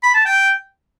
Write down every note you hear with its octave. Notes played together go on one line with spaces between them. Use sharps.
B5
A5
G5